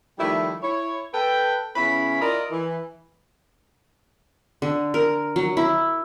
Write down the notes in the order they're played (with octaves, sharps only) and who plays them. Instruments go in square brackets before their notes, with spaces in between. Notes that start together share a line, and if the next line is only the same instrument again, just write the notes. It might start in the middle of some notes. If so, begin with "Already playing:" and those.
[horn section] D#3 F3 G3 A3 E4
E4 C#5
A4 B4 G5
C#3 B3 C#4 E4 B5
E4 F4 A#4 D5 D#5
E3
[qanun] D3
A#4
F#3
E4